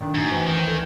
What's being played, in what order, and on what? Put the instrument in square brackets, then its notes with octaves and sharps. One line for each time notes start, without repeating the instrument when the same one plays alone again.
[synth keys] A#2 A3 D4 [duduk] D#3
[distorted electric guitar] F#2 [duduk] D#4
[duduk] E3 [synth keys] C5 E5 G5
[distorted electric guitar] D#3
[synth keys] D2 A4 G#6 [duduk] E3